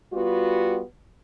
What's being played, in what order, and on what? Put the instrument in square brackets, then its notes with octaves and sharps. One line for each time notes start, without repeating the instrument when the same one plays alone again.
[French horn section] G3 B3 F4 F#4